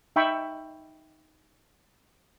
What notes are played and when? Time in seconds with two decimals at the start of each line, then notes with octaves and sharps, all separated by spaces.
0.16 D#4 E5 G5 B5 C#6